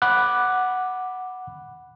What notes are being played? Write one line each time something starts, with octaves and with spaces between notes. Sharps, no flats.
F#5 B5 D6 F#6